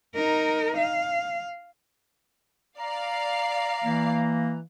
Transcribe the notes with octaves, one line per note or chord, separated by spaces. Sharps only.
D#4 A#4
F5
D5 F5 A#5 C7
E3 A#3